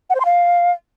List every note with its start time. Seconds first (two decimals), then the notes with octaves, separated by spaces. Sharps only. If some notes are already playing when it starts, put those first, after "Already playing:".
0.10 F#5
0.15 C5
0.20 C6
0.25 F5